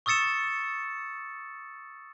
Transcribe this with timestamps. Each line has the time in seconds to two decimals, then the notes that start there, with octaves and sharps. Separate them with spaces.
0.06 C#6 D#6 E6 A6 C#7 E7